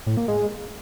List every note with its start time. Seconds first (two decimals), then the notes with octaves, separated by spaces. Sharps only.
0.07 A2
0.17 A#3
0.28 G#3